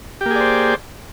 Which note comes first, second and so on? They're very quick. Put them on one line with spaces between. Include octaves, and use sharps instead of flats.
G4 A#3 G#4 D5 C5